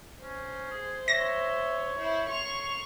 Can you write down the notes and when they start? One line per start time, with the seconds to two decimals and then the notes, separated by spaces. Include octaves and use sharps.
0.23 C#4 C5
0.71 G#4
1.08 C#5 E5 A#6
1.99 E4 C5
2.30 C6 C#6 F7